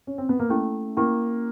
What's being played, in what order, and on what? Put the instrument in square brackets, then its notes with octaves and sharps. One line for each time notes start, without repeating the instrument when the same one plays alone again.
[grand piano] C#4
C4
B3
A#3
[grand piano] A3 [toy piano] C#4 E4 G4
[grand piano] A#3 [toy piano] C#4 E4 G4